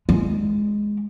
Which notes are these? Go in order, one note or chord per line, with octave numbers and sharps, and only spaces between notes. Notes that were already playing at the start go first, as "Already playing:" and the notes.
G#3